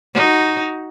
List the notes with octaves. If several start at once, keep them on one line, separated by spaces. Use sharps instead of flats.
D#4 F#4